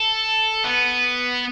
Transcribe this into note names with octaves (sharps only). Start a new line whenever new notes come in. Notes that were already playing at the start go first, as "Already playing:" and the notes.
Already playing: A4
B3